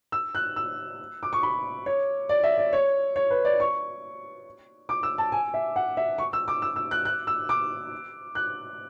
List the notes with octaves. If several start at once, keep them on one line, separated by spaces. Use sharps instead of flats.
E6
F#6
E6
D6
C#6
B5
C#5
D5
E5
D5
C#5
C#5
B4
D5
C#6
D6
E6
A5
G#5
E5
F#5
E5
C#6
E6
D6
E6
E6
F#6
F#6
E6
D6
F#6